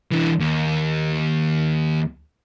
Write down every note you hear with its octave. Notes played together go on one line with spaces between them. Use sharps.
E3 D4
D#2